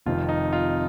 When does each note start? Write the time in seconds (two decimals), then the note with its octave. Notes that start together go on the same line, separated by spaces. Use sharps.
0.06 F1 F2 C3 D#3 F4
0.29 D#4
0.53 F4